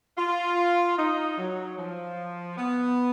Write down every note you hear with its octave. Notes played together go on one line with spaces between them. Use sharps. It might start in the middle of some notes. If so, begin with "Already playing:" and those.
F4
D#4
F#3
F3
B3